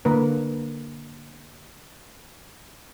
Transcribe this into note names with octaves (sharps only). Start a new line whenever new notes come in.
D3 A#3 A#4 B4